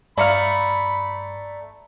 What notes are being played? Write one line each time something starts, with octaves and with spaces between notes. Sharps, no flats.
G2 A3 D5 F5 A#5 B5 C#7